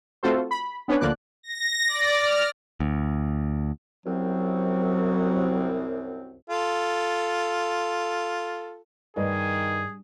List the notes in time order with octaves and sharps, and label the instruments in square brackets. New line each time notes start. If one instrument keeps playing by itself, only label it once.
[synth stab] A3 C4 F4 F#4 A4 C5
B5
B3 C#4 D4 B4 C#5
D2 D3 F3 A#3 D5 F#6
[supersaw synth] A#6
D5
F6
[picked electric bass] D2
[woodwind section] C2 F#2 C4 [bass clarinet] F#3
[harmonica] F4 A4
[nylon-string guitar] G2 [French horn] D#3 [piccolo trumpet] G#4 [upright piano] B4 D5 D#5